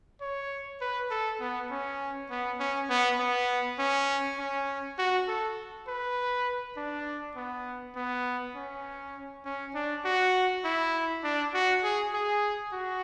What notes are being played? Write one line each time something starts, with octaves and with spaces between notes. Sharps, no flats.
C#5
B4
A4
B3
C#4
B3
C#4
B3
B3
C#4
C#4
F#4
A4
B4
D4
B3
B3
C#4
C#4
D4
F#4
E4
D4
F#4
G#4
G#4
F#4